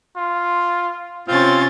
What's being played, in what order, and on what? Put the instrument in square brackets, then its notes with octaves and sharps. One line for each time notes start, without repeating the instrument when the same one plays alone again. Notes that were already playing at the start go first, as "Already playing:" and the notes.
[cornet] F4
[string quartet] C3 C#4 A6 [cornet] C4 [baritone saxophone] F4